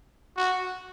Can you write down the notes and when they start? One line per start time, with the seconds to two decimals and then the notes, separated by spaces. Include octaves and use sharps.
0.37 F#4